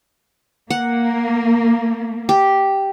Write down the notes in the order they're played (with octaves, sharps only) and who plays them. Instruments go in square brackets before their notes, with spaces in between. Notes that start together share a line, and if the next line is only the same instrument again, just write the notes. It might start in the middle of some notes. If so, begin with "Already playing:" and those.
[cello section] A#3 [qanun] F#5
[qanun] G4